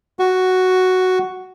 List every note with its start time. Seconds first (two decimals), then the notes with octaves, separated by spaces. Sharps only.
0.19 F#4